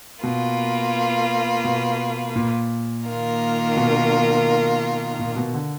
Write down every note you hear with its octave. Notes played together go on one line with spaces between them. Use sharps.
B2 A#3 F4 B4
B2
A#2
D#3 A#3 F4 A#4
B2
A#2
B2
D3